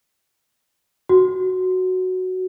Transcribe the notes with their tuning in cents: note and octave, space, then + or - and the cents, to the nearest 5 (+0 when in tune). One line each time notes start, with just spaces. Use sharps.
F#4 +0